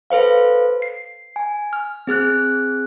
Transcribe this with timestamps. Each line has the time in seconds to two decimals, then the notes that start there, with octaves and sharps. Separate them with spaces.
0.10 A4 B4 C5 F5
0.82 C7
1.36 G#5
1.73 F6
2.07 C4 G#4 F6 F#6